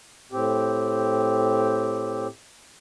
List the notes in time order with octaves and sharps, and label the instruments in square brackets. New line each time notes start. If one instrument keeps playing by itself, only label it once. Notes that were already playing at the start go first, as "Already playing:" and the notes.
[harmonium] A2 C4 G4